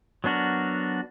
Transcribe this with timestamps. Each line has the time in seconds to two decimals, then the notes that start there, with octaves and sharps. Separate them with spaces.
0.24 F#3 B3 D4 F#4 A#4